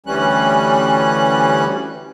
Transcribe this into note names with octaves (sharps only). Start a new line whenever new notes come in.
D2 E3 G3 C#4 F#6